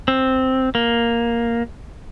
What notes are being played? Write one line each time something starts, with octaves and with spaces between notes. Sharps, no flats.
C4
A#3